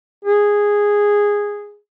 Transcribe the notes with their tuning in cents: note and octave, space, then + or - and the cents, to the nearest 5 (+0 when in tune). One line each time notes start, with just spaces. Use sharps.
G#4 -10